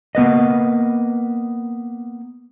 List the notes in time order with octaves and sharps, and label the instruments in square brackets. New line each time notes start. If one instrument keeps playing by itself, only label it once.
[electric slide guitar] A#3 B3 B4 D#5